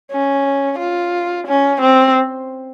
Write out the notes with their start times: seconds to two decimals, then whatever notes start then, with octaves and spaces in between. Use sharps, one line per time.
0.12 C#4
0.79 F4
1.47 C#4
1.81 C4